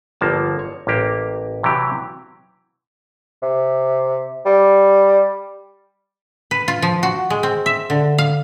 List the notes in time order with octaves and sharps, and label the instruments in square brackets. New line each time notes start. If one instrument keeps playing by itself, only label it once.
[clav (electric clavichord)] G1 F3 A#3 A5
C#5
A1 A#3 G4
C3 E3 F#3 G4
[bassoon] C3
G3
[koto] B4
F4
F3
F#4
G#3
C4
E5
D3
F5